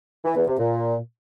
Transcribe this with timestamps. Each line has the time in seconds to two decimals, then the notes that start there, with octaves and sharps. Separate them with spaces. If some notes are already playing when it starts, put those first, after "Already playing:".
0.25 E3
0.36 E2
0.47 C3
0.58 A#2